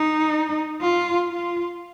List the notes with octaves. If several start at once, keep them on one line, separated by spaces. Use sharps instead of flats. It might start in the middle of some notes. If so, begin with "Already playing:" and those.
Already playing: D#4
F4
F4